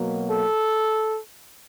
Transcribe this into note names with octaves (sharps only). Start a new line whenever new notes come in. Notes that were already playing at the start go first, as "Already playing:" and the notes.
Already playing: B2 F#3 A#3
A4